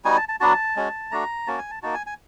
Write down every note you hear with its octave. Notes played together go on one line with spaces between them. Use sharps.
G3 B3 D#4 F#4 G#5
A5
A5
F#3 B3 D4 F#4 A5
G#3 C#4 F#4
A3 D4 F#4 A#5
A#3 C#4 F#4 A5
G#5
A5
A#3 D#4 F#4 A5
G#5
G#5